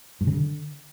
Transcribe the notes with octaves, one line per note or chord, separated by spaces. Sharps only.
G2
C#3
D3